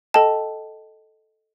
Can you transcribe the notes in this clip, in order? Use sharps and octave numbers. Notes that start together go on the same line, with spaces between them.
A4 D#5 G5 A5